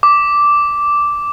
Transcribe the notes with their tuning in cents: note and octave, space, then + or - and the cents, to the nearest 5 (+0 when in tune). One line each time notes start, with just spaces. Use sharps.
D6 -5